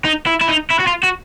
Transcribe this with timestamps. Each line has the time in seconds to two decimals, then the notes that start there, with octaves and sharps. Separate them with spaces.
0.05 D#4
0.27 E4
0.41 E4
0.49 D#4
0.71 E4
0.80 F#4
0.87 F4
1.04 F#4